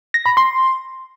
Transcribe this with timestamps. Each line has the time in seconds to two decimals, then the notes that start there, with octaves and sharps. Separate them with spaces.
0.14 A#6
0.26 B5
0.37 C6